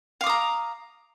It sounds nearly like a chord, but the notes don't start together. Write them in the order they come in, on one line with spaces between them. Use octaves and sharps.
F5 D6 D#6 A#5